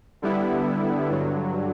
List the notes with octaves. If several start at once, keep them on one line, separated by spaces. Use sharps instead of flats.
D3 G3 B3 E4
G2 D3 F#3